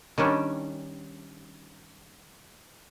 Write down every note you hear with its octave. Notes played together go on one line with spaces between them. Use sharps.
D#3 G3 C#4 D4